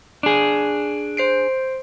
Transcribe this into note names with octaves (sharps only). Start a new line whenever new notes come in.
D4 G#4
C5 C7 D7